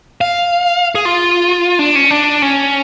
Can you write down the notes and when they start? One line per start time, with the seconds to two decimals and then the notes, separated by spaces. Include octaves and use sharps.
0.21 F5
0.95 G#4
1.05 F4
1.79 D4
1.95 C#4
2.11 D4
2.42 C#4